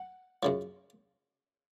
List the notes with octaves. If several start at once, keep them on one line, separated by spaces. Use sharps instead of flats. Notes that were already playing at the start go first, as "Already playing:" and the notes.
Already playing: F#5
F#2 C#3 F3